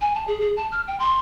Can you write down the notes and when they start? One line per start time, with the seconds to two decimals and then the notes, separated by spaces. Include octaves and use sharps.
0.01 G#5
0.15 A5
0.27 G#4
0.40 G#4
0.56 A5
0.72 F6
0.87 G5
0.99 C6